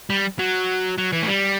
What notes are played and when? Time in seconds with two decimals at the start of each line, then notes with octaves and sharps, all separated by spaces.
0.10 G3
0.39 F#3
0.98 F#3
1.13 E3
1.23 A3
1.28 G3